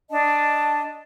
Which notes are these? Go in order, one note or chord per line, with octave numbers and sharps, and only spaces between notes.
D4 D#5 A5